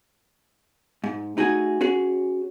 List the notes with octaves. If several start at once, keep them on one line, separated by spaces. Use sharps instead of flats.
G#2
A3 D#4 F#4 G#4 G#5
C#4 F#4 G#4